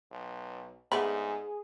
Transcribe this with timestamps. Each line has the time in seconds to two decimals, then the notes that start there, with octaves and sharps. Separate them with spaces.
0.11 B1
0.92 G#2 A3 B3 D4 G#4 B5